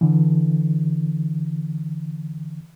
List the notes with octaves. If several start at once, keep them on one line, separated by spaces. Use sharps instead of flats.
D3 E3